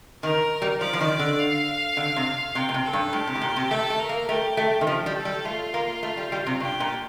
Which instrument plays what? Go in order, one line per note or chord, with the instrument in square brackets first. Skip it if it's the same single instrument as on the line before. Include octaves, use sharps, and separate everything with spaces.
[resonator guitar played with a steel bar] D#3 [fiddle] A#4
[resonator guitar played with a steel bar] G3
[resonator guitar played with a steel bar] F3 [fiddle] D5
[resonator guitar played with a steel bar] F3
D#3
D3
[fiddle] F5
[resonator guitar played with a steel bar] D3
C3
[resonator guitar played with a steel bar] C3 [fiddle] G5
[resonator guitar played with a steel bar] A#2
C3
[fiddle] A4
[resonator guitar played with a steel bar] G2
[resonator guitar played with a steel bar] A2 [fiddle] G4
[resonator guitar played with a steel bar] C3
A2
A#2
C3
[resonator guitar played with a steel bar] A3 [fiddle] A4
[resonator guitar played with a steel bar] A3
[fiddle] A#4
[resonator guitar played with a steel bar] A#3
[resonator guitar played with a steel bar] A3 [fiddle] G4
[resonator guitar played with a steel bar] A3
D#3
[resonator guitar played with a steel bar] F3 [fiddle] G4
[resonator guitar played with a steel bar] G3
[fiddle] A4
[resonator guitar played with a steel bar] G3
[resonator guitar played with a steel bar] A3 [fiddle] F4
[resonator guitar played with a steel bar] A#3
A3
G3
G3
C3
[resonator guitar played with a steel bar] G2 [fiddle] G4
[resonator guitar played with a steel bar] A#2